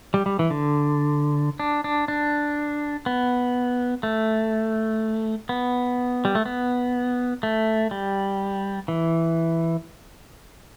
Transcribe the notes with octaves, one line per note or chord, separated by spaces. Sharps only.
G3
G3
E3
D3
D4
D4
D4
B3
A3
B3
G3
A3
B3
A3
G3
E3